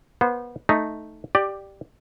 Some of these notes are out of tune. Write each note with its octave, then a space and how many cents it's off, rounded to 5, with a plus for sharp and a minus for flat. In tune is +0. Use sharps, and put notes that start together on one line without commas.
B3 -25 C5 -20
A3 +0 D#4 +0
G4 +0 D5 +15